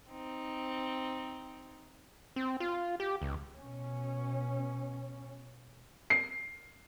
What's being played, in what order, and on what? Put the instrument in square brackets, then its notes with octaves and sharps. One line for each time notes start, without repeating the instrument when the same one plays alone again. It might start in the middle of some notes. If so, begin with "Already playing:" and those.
[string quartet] C4 D#4
[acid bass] C4
F4
G4
C#2
[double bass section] B2 C#4
[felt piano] C7